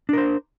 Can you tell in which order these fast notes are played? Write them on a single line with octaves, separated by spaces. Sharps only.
D4 A#4 C5